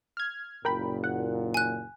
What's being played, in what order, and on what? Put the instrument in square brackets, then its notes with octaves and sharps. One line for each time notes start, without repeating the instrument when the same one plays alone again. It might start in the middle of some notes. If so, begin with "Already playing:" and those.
[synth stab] F6 G#6
[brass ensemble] F#1 A#2 [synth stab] A#4 G5 B5
[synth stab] F#5
[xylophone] G#5 F#6